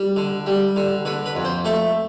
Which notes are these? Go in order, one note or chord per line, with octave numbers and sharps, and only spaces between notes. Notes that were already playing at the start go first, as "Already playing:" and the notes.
Already playing: G3
D3
G3
D3
D3 B4
B4
F2
C5
A3 A4